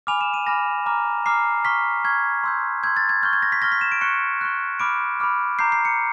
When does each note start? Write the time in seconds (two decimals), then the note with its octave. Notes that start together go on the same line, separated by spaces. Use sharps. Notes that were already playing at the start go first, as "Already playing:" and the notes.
0.07 G#5 B5 D6 F6 F7
0.21 E7
0.34 D#7
0.47 G#5 B5 D6 F6 A#6
0.86 A#5 D6 F6
1.26 A#5 D6 F6 C7
1.65 C#6 F6 B6
2.04 C#6 F6 G#6
2.44 C6 E6 G6
2.83 C6 E6 G6 G#6
2.97 A6
3.09 G#6
3.23 C#6 F6 G6
3.33 G#6
3.43 A#6
3.52 B6
3.62 C#6 F6 A#6
3.72 B6
3.81 E7
3.92 D7
4.01 C#6 F#6 C#7
4.41 C#6 F#6
4.79 B5 D6 F6 D7
5.20 B5 D6 F6
5.59 A#5 D6 G6 C7
5.72 C7
5.85 C#7